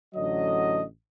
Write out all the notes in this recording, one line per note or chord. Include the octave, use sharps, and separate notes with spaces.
A1 D3 F#3 D#5